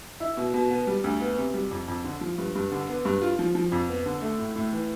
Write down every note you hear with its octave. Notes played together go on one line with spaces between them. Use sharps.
E4
B2
B2
B3
G3
D2
B3
C3
G3
F2
F2
D3
F3
G2
G2
D3
B3
G2
F4
F3
F3
F2
B3
D3
A3
A2
A2
E3